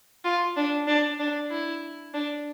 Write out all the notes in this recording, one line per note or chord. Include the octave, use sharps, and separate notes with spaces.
F4
D4
D4
D4
E4
D4